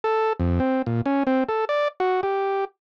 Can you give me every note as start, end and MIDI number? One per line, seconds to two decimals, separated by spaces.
0.04 0.33 69
0.40 0.60 41
0.60 0.82 60
0.86 1.01 46
1.06 1.23 61
1.27 1.44 60
1.49 1.65 69
1.69 1.88 74
2.00 2.21 66
2.23 2.65 67